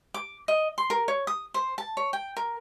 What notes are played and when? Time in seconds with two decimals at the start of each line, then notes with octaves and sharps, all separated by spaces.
0.14 D6
0.48 D#5
0.78 C6
0.90 A#4
1.08 C#5
1.27 D#6
1.54 C5
1.78 A5
1.97 C#5
2.13 G5
2.37 A#4